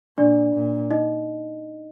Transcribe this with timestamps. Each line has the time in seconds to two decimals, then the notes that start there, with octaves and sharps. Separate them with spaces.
0.18 A#2 D4 D5
0.54 A#2
0.91 D#4 D#5